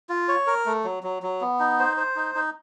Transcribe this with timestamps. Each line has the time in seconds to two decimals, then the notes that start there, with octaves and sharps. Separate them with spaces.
0.09 F4
0.28 C#5
0.47 A#4
0.66 A3
0.84 F#3
1.03 F#3
1.23 F#3
1.41 B3
1.60 D#4
1.79 C5
1.97 C5
2.16 D#4
2.35 D#4